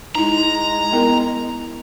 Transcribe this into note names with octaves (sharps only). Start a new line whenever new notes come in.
G#3 D#4 E4 A#5
B3 E4 A#4